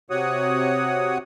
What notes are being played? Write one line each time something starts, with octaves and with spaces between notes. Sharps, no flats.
C3 F#4 C#5 F#5 D#6